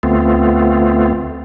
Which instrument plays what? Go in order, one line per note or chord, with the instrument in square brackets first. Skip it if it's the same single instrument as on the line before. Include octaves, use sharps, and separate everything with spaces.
[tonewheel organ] D2 A3 B3 C4 F4